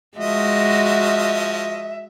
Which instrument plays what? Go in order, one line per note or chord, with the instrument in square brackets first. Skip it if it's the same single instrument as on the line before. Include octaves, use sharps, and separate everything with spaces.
[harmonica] F3 D#5 [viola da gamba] G#3 F#4 [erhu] E5